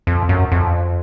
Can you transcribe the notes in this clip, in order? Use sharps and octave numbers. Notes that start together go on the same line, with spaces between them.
F2
F#2
F2